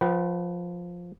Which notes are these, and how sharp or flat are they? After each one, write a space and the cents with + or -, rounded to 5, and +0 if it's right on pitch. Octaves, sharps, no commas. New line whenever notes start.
F3 +10 B4 -10 G5 -45